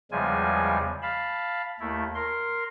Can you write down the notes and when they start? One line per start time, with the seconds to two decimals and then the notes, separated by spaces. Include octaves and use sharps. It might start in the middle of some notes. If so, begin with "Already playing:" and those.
0.11 E2 C#3 F3 G3 G#3 G#5
1.02 F5 A5 B5
1.80 D#2 A3 E4
2.15 A#4 C6